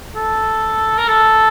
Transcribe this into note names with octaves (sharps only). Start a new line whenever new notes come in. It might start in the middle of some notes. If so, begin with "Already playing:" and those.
A4
A#4
A4